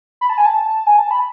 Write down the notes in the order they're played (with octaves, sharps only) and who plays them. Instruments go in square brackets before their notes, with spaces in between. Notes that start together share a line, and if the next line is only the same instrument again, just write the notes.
[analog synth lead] B5
A5
G#5
A5
G#5
A5
B5